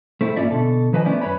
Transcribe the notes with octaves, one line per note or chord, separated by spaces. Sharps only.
A3 C4 E4
G#2 A#3 C#4 F4 D5 E5
B2 D3 A4
D#3 F3 B4 D#5 G5 G#5
A3 B3 C#4 E4 C5 D5
F#2 B4 C#5 B5